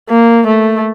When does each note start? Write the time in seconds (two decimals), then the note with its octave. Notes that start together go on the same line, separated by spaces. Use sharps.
0.09 A#3
0.47 A3